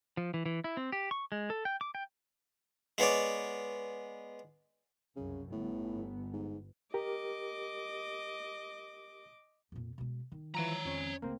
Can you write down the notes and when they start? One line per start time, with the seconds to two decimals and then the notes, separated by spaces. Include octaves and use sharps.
0.17 F3
0.34 E3
0.46 E3
0.64 E4
0.77 C4
0.92 G4
1.11 C#6
1.32 G#3
1.50 A4
1.65 G5
1.81 D6
1.95 G5
2.98 G#3 B3 C#5 D5
5.16 C2 F#2 C#3
5.52 G1 A2 B3
6.33 G#2
6.94 G4 A#4 D#5 D6
9.72 F2 A#2
9.98 B2 G#3
10.32 D#3
10.54 E3 F3 C#5 A#5
10.85 F2 C#4
11.22 D2 C#3 A#3 C4